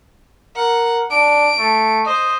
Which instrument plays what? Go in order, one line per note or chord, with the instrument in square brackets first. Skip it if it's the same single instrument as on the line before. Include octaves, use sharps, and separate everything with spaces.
[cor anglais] A#4 [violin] F#5
[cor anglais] D4 [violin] D7
[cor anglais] A3
[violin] C5 [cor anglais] D#5